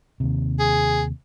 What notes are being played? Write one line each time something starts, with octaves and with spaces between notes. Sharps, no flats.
D#2 C3
G#4